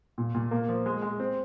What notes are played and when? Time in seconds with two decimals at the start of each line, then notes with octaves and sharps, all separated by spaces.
0.18 A#2
0.34 A#2
0.51 A#3
0.68 F3
0.86 G#3
1.02 G#3
1.20 C4